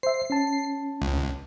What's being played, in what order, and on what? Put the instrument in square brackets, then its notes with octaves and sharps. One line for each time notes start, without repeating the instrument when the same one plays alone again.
[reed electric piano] C5 E5 [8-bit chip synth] C7
[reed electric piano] C#4 A5
[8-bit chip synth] C#2